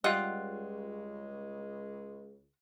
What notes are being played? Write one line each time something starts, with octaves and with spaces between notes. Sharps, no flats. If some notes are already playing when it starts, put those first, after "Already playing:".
C#2 G3 G#3 F4 D#5 F#5